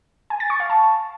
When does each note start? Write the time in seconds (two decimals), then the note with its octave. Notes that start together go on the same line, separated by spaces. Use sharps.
0.30 G#5
0.40 A6
0.50 C#6
0.60 F5
0.70 A5